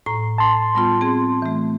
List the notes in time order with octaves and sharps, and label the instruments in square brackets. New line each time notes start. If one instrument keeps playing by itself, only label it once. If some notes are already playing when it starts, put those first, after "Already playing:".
[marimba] A2 A#5
[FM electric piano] A5 C6
[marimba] G3 B3 F4
C4 G#4
E3 A3